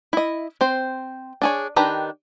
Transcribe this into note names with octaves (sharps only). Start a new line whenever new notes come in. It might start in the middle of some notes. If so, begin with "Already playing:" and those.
E4 D#5
C4 C5
D4 G#4 C#5
D#3 D4 G4 B4 A#5